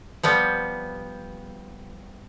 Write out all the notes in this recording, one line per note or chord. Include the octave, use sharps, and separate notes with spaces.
F3 G3 B3